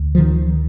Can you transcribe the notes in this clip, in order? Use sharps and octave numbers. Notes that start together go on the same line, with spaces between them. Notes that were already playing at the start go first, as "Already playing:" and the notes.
Already playing: D2
F3
D#3